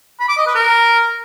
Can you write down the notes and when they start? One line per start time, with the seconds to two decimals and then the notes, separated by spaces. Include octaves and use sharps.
0.20 B5
0.29 D6
0.38 D#5
0.46 B4
0.55 A#4